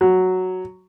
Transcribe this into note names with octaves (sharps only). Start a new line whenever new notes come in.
F#3